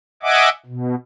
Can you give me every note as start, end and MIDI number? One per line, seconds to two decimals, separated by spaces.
0.23 0.49 75
0.23 0.49 76
0.23 0.49 78
0.23 0.49 80
0.23 0.49 86
0.66 0.95 47